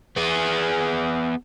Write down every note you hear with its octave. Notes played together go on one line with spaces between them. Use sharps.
B3 G#4